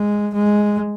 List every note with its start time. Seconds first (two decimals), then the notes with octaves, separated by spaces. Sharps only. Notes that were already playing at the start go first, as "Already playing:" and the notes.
Already playing: G#3
0.35 G#3